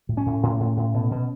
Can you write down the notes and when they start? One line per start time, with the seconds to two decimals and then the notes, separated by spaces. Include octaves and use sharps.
0.09 A2
0.17 C#4
0.26 A2
0.43 A2
0.60 A2
0.77 A2
0.94 B2
1.11 B2